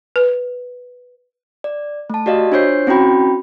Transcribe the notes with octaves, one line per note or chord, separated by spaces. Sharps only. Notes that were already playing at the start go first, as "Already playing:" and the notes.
B4
D5
A3 A5
F#4 G4 D5 D#5 F5
D4 F4 C5 C#5 G6 C7
C4 C#4 E4 F#4 G5 B5